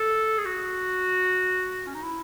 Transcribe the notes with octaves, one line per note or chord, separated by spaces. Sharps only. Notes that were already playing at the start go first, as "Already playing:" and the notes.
Already playing: A4
G#4
F#4
C#4
D#4
E4